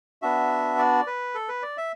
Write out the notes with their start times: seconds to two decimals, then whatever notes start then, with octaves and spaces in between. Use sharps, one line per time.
0.22 B3 D4 F#4 E5
0.78 D5
1.07 B4
1.34 A4
1.48 B4
1.63 D5
1.77 E5